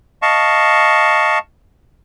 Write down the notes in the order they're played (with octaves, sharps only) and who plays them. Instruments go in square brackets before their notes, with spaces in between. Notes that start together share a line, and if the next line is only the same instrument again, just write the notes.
[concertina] D#5 F5 A5 C#6